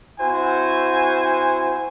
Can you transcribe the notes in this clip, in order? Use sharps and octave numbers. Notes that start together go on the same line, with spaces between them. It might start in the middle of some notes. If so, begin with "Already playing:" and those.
C4 E4 F#4 C5 G#5